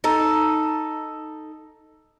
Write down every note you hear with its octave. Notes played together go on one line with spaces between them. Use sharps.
D#4 A4